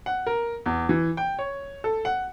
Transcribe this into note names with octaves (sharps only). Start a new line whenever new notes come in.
F#5
A#4
E2
E3
G5
C#5
A4
F#5